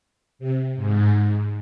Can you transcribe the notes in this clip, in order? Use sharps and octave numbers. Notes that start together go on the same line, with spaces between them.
C3
G#2